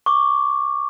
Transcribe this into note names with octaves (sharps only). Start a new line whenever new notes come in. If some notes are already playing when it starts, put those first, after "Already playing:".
C#6 D6